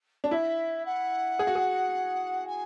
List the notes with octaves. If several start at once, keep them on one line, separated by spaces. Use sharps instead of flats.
D4
E4 E5
F#5
G#4
F#4
G#4
G#5